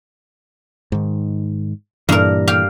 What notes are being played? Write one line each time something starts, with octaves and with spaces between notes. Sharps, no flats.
G#2 D#3
G2 A#2 E3 A#4
G4 F5